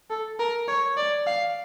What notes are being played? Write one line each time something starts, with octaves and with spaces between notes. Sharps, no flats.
A4
A#4
C#5
D5
F5